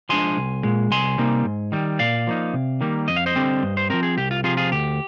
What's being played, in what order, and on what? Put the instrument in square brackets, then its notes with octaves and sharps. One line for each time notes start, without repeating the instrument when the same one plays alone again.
[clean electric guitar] F3 G#3 D4 G#5 C6
C2
A#2 G#3
C2 G#5 C6
C3 G3 A#3 D#4
G#2
D#3 G3
A#2 D5 F5
F3 A#3 D#4
C3
D#3 G3 A#3
F2 D#5
F5
C5 D#5
D3 G3 C4
G2
C5
F3 C4 A#4
G#4
C2 G4
F4
C3 F3 F4 G#4
F4 G#4
D2 G4